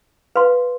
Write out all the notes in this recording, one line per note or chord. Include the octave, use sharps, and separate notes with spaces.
B4 F5 C6